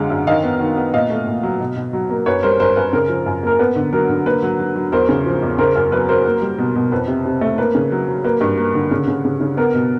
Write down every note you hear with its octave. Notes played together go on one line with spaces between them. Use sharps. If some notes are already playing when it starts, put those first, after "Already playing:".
Already playing: F#2 D3 G#3 F5
F#2
D#3 D#5 F5
B3
D#3
B3
A#2 D#5 F5
A3
A#2
F#3
B2
B2
F#3
A#3
F#2 B4 C#5
G3 A#4 C5
F#2 A#4 C5
F#2 B4
C#3 A#4
F3
F#2
A#3 A#4
B3 B4
D3
F#3 A#4
D3
A#3 B4
F#3
F#3
F#3
E2 A#4 C5
C#3
F3
E2
C#3 A#4 C5
F#2 A#4
F#3 B4
F#3 A#4 C5
A#3
G3
B2
B2
F2 B4
C3
C3
A3
A#3 B4
C#3
F#3
F#3
A#3 B4
G2
A#3
D3
C#3
C#3
C#3
C#3
B3 A#4
B2